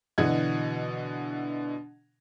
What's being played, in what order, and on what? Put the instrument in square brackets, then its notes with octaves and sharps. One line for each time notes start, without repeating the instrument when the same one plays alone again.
[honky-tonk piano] B2 D3 E3 D#5 F#5 G#6